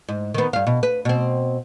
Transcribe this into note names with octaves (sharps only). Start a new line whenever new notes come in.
G#2
D#3 B3
G2 F5
B2
B4
B2 C4